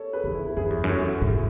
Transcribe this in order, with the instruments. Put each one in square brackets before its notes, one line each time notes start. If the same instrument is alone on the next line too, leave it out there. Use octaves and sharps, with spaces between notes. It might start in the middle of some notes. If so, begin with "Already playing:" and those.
Already playing: [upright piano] A4 C#5
G#4 B4
[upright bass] E2
[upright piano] E4 G#4
[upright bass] F#2 [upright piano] E4 G#4
[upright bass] E2
F#2
[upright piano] F#4 A4
[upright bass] G#2 [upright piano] E4 G#4